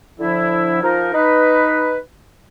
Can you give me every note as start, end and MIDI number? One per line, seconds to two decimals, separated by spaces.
0.20 0.80 50
0.20 0.80 53
0.20 0.80 64
0.83 1.12 53
0.83 1.12 63
0.83 1.12 70
1.14 1.98 63
1.14 1.98 71